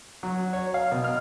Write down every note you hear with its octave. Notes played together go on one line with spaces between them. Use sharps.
F#3
C#5
F5
B2
F6